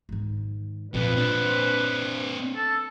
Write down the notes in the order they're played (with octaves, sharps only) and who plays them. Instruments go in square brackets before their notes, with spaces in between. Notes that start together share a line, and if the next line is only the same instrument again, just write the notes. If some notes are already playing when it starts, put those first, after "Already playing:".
[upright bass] G#2 D#3
[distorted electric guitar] F2 [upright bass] A#2 F4 [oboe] B4
[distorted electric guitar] C4 D4
[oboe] A4